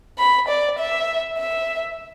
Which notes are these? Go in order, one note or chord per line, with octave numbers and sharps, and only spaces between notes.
B5
D5
E5
E5